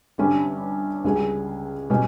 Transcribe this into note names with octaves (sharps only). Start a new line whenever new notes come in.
G1 G2 G3 C#4
C#2 C#3 G3 C#4 G#4
B2 G3 C#4